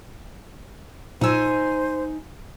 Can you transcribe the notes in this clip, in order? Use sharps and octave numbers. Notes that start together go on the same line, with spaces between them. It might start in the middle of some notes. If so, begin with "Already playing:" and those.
A#2 D#4 C5 G#5 E6